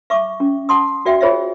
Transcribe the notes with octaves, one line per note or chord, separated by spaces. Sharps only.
E5 C#6 D6
C#4
F#5 A5 C6 D#6
F#4 D5 E5 F#5 G5
F4 G#4 C5 C#5 D#5 E5